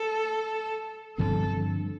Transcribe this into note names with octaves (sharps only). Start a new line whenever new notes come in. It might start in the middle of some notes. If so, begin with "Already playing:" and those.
Already playing: A4
G2 D3 F3 C4 A4